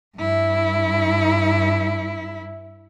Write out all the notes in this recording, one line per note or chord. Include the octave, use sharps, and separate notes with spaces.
G2 E4